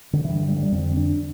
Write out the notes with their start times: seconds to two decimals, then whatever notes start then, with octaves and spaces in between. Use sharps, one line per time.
0.13 D3
0.24 G2 D3 E3
0.48 G3
0.56 F3
0.63 G3
0.72 F2 D3 C4
0.97 D4